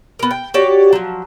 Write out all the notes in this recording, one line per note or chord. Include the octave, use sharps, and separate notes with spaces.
B3 A#4
G5
F#4 G4 C#5 D5
F3 F#3